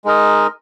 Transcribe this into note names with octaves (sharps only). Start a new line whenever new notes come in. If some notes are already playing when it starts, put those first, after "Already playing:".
G#3 D#4 A#4 D#5